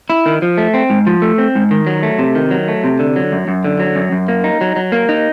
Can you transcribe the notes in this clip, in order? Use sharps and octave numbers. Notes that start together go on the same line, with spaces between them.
E4
D#3
F3
A3
C4
G#2
F3
A3
C4
G#2
D#3
F#3
A3
C3
D#3
F#3
A3
C3
D3
F#3
F#2
F#2
D3
F#3
F#2
F#2
A#3
D#4
F#3
F#3
A#3
D#4